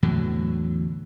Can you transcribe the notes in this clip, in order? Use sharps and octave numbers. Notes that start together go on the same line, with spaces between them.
E2 A2 D3 F#3